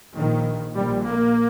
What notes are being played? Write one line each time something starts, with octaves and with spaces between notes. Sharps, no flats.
A#1 A#2 D#3
A#1 A#2 G3
A#3